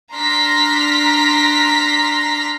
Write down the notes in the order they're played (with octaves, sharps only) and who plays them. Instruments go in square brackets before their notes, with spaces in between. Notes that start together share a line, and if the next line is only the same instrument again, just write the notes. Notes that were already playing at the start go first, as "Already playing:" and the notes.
[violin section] D4 A#5 C6 F6 A#6 B6